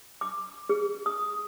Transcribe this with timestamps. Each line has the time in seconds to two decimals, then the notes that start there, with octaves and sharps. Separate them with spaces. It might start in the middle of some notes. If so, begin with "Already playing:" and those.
0.21 D6
0.69 G#4
1.06 D#6